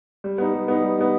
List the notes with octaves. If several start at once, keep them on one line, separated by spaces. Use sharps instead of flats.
G3
B3 D#4
G3
B3 D#4
G3
B3 D#4